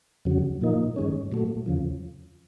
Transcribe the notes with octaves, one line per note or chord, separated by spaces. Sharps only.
F2 C#3 F#3
A#2 F3 A#3 D#4
G2 D#3 G#3 C#4
A#2 F#3 A3
E2 C#3 F3